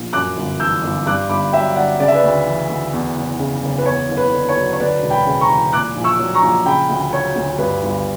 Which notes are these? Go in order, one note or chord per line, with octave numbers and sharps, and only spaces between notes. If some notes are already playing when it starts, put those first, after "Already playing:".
Already playing: A#1
F#2 D6 F#6
G1
E3 E6 G6
G1
G2 D6 F#6
G1 B5 D6
F#3 E5 G5
G1 D5 F#5
C#3 D5
E5
B4 D5
D2
E3
D2
E2
F#1
C#3
F#1
B4
E2 C#5
F#1
B4
D3
C#5
F#3
C#5
D2 B4 D5
E1
G5 B5
C#3
A#5 C#6
E3
A#2 D6 F#6
A#1
C#6 E6
F#3
A#5 C#6
A#1
C#3 G5 B5
D2
F#3 C#5
D2
G2 B4
G1